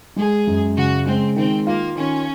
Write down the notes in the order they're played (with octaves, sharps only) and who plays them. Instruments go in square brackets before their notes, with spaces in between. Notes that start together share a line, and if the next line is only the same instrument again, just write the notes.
[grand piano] G#3 [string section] G#4
[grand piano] F#2
[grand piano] C#3 [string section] F#4
[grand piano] G#3 [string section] C4
[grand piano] D#3 [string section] C4
[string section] A#3 [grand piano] F4
[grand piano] D#3 [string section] C#4